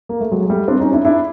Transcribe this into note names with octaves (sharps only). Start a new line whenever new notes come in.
A#3
A3
F#3 G#3
G#3
G3 A3
C4 D4
C#4 D#4
D4 E4
D4 E4